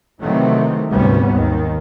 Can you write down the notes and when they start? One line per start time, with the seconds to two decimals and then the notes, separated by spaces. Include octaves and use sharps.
0.22 C3 D#3 E3 F#3 A3 C4
0.93 G#1 D2 C3 G3 B3 C#4
1.34 D#2 D#3